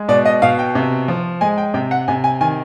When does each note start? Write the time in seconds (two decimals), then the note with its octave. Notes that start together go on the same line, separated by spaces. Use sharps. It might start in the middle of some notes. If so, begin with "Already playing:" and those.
Already playing: G#3
0.08 B2 D5
0.25 D#5
0.42 B2 F5
0.59 G5
0.75 C3
1.08 F3
1.41 G#3 G#5
1.58 G5
1.74 C3 G5
1.91 F#5
2.08 C3 G#5
2.24 G#5
2.41 D#3 G#5